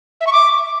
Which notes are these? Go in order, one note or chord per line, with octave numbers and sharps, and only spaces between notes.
E5
C#6
D6